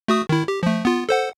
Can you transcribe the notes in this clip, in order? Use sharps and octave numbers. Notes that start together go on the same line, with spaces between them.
A3 F#4 D#6
D#3 E4
G4
F3 A3
B3 F4
A4 C5 F#5